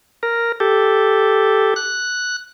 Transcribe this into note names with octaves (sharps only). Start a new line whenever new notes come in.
A#4
G4 A4
F#6